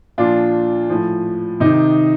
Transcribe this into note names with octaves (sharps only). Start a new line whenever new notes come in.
A#2 F3 D4 F4
A2 F3
C3 D#3 D#4